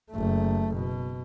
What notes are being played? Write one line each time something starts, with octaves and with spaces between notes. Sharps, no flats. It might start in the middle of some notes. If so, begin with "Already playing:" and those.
F#1 A3
B2